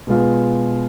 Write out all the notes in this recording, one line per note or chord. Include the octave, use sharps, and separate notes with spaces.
B2 G#3 B3 F4